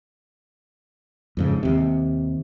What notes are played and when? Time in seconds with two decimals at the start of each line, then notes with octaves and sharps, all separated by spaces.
1.37 F2 G#2 C#3
1.63 D#2 C3